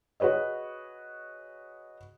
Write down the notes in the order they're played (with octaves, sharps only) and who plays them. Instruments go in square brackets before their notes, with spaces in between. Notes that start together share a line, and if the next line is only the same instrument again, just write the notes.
[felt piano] F#4 G#4 B4 C#5 D#5